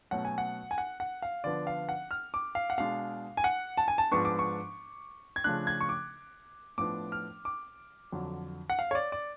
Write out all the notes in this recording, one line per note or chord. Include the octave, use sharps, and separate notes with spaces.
B2 F#3 A3 C#4 F#5
G#5
F#5
G#5
F#5
F#5
F5
D3 F3 B3 D4 D5
F5
F#5
F6
D6
F5
F#5
B2 G#3 D4 F5
G#5
F#5
A5
G#5
A5
G#2 F3 B3 D4 C#6
D6
C#6
G#6
C#3 F3 A3 D4 F#6
G#6
C#6
D6
A2 F3 B3 D4 D6
F6
D6
F2 D3 F#3
F#5
F5
C#5
D5
D5